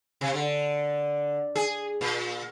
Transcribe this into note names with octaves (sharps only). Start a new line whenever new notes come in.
C3
D3
G#4
A#2